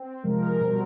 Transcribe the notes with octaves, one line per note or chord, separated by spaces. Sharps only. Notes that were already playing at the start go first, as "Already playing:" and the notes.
Already playing: C4
C3 F3 G#3 A#4
A#4
B2 G3 C4